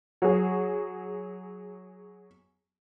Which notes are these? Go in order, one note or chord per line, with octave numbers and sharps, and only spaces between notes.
F#3 G#4